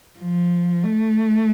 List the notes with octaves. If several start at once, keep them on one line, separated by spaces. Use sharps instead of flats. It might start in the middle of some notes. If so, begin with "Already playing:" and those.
F3
A3